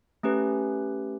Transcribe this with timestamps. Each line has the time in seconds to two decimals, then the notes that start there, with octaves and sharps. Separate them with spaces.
0.23 A3 C#4 G4 B4